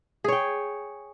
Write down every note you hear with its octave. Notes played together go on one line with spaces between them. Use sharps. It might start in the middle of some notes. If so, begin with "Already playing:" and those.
G#4 C#5 G5